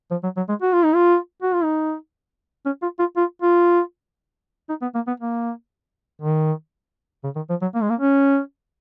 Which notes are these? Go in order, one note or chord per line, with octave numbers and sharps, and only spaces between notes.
F3
F#3
F#3
G#3
F#4
F4
D#4
F4
F#4
F4
D#4
C#4
F4
F4
F4
F4
D#4
B3
A#3
B3
A#3
D#3
C#3
D#3
F3
F#3
A#3
G#3
A#3
C#4